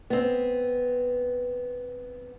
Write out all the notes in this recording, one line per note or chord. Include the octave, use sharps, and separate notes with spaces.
B3 C4